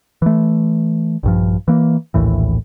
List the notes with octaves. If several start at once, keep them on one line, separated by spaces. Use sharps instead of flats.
E3 A3
A#1 G2 F3
E3 A#3
A#1 D#2 A2 E3